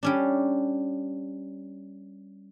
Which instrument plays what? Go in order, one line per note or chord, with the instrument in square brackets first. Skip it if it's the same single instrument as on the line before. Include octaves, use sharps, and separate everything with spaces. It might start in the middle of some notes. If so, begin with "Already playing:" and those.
[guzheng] G3 C#4 D4